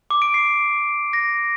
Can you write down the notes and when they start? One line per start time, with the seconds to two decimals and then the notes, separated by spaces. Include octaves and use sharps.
0.10 D6
0.22 D7
0.34 C7
1.13 A#6